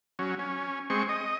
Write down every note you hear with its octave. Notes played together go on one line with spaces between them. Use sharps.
F#3 C#4
C#4
G#3 C4 C#6
D#5